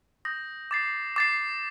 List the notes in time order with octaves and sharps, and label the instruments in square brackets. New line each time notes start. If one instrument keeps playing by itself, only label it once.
[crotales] D#6 G6 A#6
D6 A6 C7
D6 A6 C7